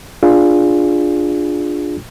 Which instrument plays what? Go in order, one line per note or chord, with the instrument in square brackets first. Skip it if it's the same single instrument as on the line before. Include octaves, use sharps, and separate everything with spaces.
[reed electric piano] D4 F4 G#4